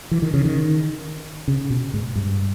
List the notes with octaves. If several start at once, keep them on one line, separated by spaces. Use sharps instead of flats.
E3
D#3
C#3
D#3
C#3
B2
G#2
G2